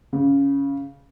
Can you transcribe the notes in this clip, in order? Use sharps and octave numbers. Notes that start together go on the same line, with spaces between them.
C#3